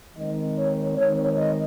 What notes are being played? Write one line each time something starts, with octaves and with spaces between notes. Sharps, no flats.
D#3 G#3 C4 D#5
C#5
D#3 G#3 C4 C#5
D#5